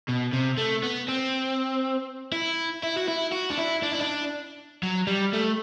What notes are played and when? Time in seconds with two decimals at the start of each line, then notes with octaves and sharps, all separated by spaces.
0.09 B2
0.33 C3
0.58 A3
0.83 B3
1.08 C4
2.32 E4
2.83 E4
2.97 F#4
3.08 E4
3.32 F#4
3.50 D4
3.58 E4
3.83 D4
3.91 E4
3.99 D4
4.83 F#3
5.07 G3
5.33 A3